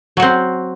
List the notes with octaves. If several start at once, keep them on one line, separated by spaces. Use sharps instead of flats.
F#3 C4 F#4